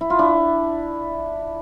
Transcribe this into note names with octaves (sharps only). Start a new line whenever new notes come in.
E4
F4
D4 E4